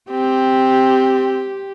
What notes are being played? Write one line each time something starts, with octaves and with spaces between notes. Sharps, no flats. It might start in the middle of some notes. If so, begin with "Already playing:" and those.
C4 G4